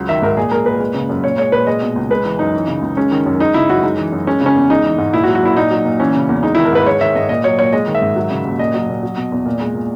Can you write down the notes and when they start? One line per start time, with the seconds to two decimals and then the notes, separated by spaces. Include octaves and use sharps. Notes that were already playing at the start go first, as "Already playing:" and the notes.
Already playing: C#2 F#3
0.09 D#3 E5
0.22 G#2 A#4
0.37 A#2 G#4
0.51 G#3 A#4
0.66 A#2 B4
0.80 G#3
0.94 C#3
1.09 F#2
1.24 A#2 C#5
1.38 G#3 C#5
1.52 A#2 B4
1.67 G#3 D#5
1.82 B2
1.96 C#2
2.10 G#3 B4
2.24 E3
2.39 F#2 D#4
2.54 E3
2.68 C#3
2.82 C#2
2.97 G#3 C#4
3.11 D#3
3.26 F#2
3.40 G#3 D#4
3.54 C#3 E4
3.69 F#2 F#4
3.83 G#3 D#4
3.98 E3
4.12 F#2
4.27 G#3 C#4
4.41 C#3 C#4
4.55 E2
4.69 G#3 D#4
4.85 E3
4.98 G#2
5.13 A#2 E4
5.24 F#4
5.28 F#3
5.35 F#4
5.43 A#2 E4
5.56 A#2 D#4
5.71 F#3
5.85 A#2
6.00 E3 C#4
6.15 C#3
6.29 E2
6.43 G#3 D#4
6.55 E4
6.58 D#3
6.65 A#4
6.73 G#2 B4
6.86 G#3 C#5
7.01 D#3 E5
7.16 G#2 D#5
7.29 A#2 D#5
7.44 F#3 C#5
7.59 A#2 C#5
7.73 G#3 D#5
7.87 D#3
7.95 E5
8.02 G#2
8.16 F#3
8.31 C#3
8.45 D#2
8.59 A#2 D#5
8.74 F#3
8.89 A#2
9.03 F#3
9.17 B2
9.32 E2
9.46 A#2
9.60 G#3
9.74 A#2